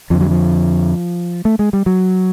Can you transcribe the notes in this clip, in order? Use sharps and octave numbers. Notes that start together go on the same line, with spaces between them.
F2 D3 F3
F#3
F3
A3
G#3
G3
F#3